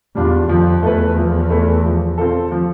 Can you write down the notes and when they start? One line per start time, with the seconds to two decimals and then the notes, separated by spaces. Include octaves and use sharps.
0.15 E2 G3 D4 F4
0.49 F2 F3
0.83 E2 A3 E4 B4
1.16 F3
1.50 A3 E4 B4
1.84 F3
2.18 C4 F4 A4
2.52 F3